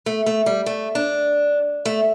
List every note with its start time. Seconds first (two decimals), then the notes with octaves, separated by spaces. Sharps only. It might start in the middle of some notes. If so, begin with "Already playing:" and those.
0.06 A3
0.26 A3
0.46 G3
0.66 A3
0.95 D4
1.85 A3